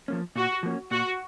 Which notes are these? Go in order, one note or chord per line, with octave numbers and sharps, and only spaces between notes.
F3 A#3 C#4
A#2 F#4
F3 A#3 C#4
A#2 F#4